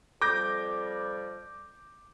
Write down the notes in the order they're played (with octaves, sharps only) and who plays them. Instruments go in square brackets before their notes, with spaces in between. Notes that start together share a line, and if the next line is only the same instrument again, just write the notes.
[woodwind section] F2 G3 [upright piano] D6 G6 A#6